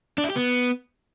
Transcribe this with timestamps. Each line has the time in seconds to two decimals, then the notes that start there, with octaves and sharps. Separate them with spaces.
0.18 D4
0.24 E4
0.30 G4
0.36 B3